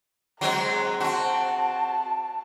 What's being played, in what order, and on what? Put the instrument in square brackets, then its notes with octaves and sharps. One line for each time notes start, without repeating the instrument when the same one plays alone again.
[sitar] F#3 G#3 C4 [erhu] A#5
[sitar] C4 F#4 [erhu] A5